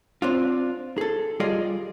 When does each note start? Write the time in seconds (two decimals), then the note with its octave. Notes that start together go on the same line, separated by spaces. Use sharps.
0.22 C4 D4 F4
0.98 G#4 A4
1.40 G3 F4 G#4 D5 D#5 F5